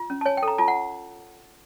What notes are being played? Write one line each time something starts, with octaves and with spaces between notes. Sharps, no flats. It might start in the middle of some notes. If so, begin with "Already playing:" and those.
Already playing: F4
C#4
A5
C#5 G#5
G5
A4
A#5
F4 A5
F#5